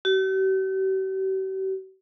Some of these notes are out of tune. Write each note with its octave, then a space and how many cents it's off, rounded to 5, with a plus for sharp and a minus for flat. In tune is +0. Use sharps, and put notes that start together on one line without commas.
G4 -45